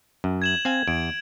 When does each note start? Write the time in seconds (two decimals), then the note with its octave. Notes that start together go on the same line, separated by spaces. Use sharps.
0.24 F#2
0.42 G#6 E7 F#7
0.65 C4 F5 G#5
0.88 E2 D7